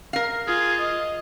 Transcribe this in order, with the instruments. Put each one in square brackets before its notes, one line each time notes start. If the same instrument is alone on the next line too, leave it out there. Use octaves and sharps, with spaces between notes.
[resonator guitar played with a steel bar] A#4 F5
[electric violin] F4 [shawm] G#4
[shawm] D#5